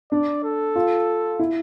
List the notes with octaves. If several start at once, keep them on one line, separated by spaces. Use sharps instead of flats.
D4 D5
A4
F4
E4